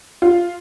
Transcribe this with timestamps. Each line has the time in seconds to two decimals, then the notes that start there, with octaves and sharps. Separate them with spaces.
0.22 F4